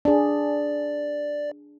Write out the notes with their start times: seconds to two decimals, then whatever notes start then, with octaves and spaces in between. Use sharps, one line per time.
0.05 D4 G#4 D5